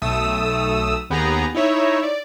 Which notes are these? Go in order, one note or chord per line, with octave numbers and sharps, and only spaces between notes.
B1 A3 D#6 E6
D#2 B3 G4 G#4 A#5
D#4 E4 C#5 E5
D5